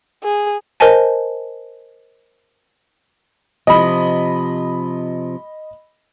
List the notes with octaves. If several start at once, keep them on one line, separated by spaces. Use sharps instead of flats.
G#4
A#4 C5 D#5 G#5 A5
C3 F3 D#5 B5